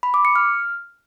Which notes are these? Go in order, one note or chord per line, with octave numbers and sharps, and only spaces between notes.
B5
D6
C#7
F6